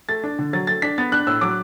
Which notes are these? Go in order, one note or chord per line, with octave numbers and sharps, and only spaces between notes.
A3 A6
D4
D3
F#3 A6
A3 A6
D4 B6
B3 A6
D4 F#6
A2 E6
F#3 D6